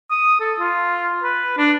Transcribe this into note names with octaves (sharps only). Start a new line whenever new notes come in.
D#6
A4
F4
B4
D4